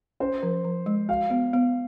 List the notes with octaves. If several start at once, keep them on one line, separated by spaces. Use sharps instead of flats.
C#4 C5
F3
F3
G#3
F#4 F5
B3
B3